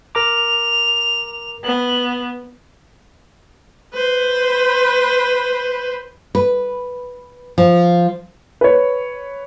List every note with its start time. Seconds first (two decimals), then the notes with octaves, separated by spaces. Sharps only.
0.15 A#4 A#5 D6 F7
1.64 B3 F#7
3.93 B4 C5
6.35 B4
7.58 F3
8.61 B4 C#5